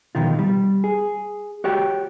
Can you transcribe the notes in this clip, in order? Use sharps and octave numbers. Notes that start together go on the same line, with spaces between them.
B2 D#3 F3 F4
G3
G#4
F#4 G4 C#5 G5